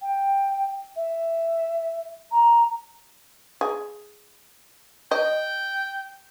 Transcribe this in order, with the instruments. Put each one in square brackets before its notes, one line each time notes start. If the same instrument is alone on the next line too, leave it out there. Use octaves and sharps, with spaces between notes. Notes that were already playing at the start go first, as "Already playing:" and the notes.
[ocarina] G5
E5
A#5
[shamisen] G#4
[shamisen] D#5 [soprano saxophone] G5